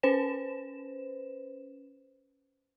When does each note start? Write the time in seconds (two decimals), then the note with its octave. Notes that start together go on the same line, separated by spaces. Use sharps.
0.03 C#4 B4 C5 E7